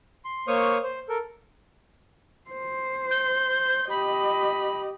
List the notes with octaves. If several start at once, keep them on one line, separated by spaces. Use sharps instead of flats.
C6
A#3 C5 C#5 C#6 D#6 F6
C5
A4 A#4
C5
G6
G4 D#5 B5